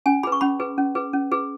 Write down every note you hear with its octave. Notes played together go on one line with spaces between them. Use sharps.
C#4 G#5
G#4 B4 B5
C#6
C#4 B5
G#4 B4
C#4
G#4 B4
C#4
G#4 B4